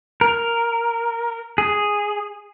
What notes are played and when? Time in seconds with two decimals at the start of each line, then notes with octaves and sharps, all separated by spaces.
0.21 A#4
1.58 G#4